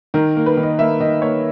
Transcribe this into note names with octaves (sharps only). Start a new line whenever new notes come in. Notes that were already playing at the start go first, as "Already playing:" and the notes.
D#3 A#4
A#3
B4
D#3
D#5
A#3 E5
D#3 D#5
A#3 C#5